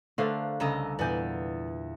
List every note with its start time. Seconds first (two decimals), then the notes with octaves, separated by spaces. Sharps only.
0.18 D3 A3 D4 A#4 C5 F5
0.60 C2 C#3 A4 D#5 A#5
0.99 E2 A#2 D5 G#5 G6